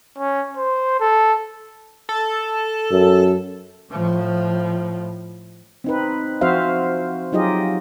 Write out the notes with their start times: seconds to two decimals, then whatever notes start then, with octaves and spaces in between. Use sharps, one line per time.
0.18 C#4
0.57 C5
1.00 A4
2.09 A4
2.91 F#2
3.92 A2 F3
5.84 C4 D#4 B4
6.41 F3 C4 F#4 C5 E5 F5
7.32 F#3 D#4 F4 G4 G#4 D#5